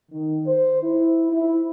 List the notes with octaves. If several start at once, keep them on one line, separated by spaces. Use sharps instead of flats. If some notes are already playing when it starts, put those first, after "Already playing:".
D#3
C5
E4
E4